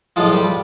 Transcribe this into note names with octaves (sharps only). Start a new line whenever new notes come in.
B1 A2 F3 G#3 F4
G3 G4